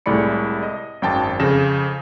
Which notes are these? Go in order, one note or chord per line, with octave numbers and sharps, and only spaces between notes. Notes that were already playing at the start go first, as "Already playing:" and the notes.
C2 A2 G#3 D5 B5 C#7
D#5
G#1 F#2 G5 A5 A6
F2 C#3 A#6 E7